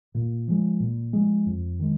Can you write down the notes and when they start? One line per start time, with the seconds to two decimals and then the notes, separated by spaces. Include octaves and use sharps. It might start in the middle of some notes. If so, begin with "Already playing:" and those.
0.15 A#2
0.48 F3 G#3
0.80 A#2
1.13 F3 G#3
1.46 F2
1.80 D#3 G#3